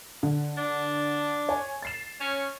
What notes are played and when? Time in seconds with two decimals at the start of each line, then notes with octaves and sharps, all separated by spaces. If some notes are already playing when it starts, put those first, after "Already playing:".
0.23 D3
0.57 D4
1.49 C#5 G#5
1.82 A6 C7 E7
2.20 C#4